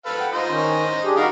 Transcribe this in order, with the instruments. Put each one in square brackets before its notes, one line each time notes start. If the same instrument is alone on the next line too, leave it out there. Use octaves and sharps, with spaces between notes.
[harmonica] A4 B4 F5
[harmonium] F#5 G5
[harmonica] D#4 C5 D#5 [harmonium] F4
[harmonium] D#3 C#4
D4 G4 G#4
[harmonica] D#3 G3 A#4 [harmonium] D#4 F#4 F5